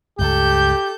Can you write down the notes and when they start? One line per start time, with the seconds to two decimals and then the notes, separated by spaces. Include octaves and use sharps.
0.19 C#2 G2 G4 A4 G6